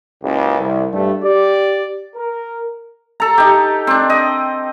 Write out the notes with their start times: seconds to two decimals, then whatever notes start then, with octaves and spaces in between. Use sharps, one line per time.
0.24 F#1 C#2
0.60 C2
0.93 G2 G3 A3
1.23 G4 D5
2.16 A#4
3.20 A4 A#5
3.38 D#4 G4
3.87 C4 D4
4.10 D#5